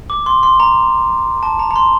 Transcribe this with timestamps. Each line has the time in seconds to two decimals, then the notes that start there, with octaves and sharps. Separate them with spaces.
0.10 D6
0.26 C6
0.43 C6
0.60 A#5
1.43 A5
1.59 A#5
1.71 A#5
1.76 C6